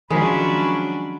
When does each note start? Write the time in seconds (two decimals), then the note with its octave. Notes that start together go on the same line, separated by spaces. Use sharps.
0.10 D#3 F3 F#3 G#3 C#4 D4 C#5 B5